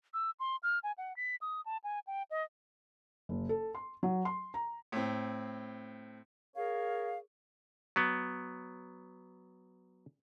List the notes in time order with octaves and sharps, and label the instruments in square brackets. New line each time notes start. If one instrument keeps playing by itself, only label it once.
[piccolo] E6
C6
F6
G#5
F#5
B6
D#6
A5
G#5
G5
D#5
[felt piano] F#1
A4
C6
F#3
C6
A#5
[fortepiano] A2 C4
[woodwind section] G#4 A#4 C#5 F5
[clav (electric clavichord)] F#3 B3